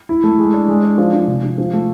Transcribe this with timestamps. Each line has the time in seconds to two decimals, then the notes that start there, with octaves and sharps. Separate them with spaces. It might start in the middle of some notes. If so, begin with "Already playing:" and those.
0.09 E4
0.24 A3
0.38 G#3
0.54 D4
0.68 G#3
0.83 D4
0.98 F3
1.13 F3
1.28 C3
1.43 F3
1.58 F3
1.73 A3